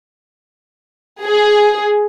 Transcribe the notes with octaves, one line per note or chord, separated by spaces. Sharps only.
G#4